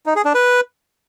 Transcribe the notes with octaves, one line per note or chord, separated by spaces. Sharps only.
D#4
G#4
D4
B4